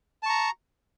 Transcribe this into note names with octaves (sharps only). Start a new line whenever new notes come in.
A5 A#5 C#6